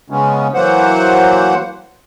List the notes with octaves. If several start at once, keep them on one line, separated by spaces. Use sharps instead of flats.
C#3 G#3 B3 C#4
E3 F#3 A#3 C5 F#5